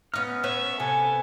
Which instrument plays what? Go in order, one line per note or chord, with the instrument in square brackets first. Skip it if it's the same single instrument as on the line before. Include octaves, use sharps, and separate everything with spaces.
[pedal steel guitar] B3 F6 [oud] C#4 D#4
[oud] C#4 B4 C#5 [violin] E5
[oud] C3 [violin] A4 [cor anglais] G#5